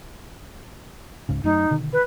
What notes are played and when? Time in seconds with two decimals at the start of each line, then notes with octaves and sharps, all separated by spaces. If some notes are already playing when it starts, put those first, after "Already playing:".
1.29 C#2 G#2 C#3
1.44 F#2 F#3 A3 D#4
1.71 B2 D3 D#3
1.93 B4